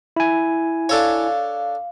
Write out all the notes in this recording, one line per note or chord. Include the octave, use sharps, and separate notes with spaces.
E4 G#5
D4 A4 C#5 F5